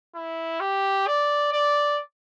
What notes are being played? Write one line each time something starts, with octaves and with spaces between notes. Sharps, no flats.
E4
G4
D5
D5